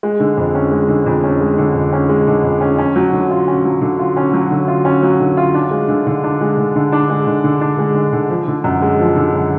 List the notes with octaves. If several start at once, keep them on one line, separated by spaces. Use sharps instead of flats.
G#3
D3
F2
C#4
G#3
D3
F2
C#4
G#3
D3
F2
C#4
G#3
D3
F2
C#4
C#4
F#3
D3
F4
C#4
F#3
D3
F4
C#4
F#3
D3
F4
C#4
F#3
D3
F4
D4
G#3
D3
D3
D4
G#3
D3
D3
D4
G#3
D3
D3
D4
G#3
D3
D3
F3
D3
F#2
G#3
F3
D3
F#2